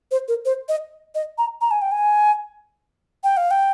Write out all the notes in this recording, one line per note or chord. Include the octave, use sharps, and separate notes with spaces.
C5
A#4
C5
D#5
D#5
A#5
A#5
G#5
G5
G#5
G5
F5
G5